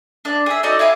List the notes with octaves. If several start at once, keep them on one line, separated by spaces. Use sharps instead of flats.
D4 D5
G#4 E5
D#4 F#4 A4 D5
E4 F5 G#5 D6